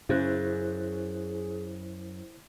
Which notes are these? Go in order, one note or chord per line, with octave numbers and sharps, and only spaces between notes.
F#2 C#3 E4 G#4 C5 F#6